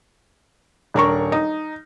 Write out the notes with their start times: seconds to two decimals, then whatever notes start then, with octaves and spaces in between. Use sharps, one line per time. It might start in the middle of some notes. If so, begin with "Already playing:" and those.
0.94 D#1 D4 A#4 C#6
1.32 D#4